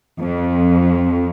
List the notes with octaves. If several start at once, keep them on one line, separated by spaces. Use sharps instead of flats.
F2